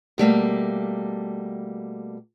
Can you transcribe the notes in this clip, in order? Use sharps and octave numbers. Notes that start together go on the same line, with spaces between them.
B2 G3 A3 A#3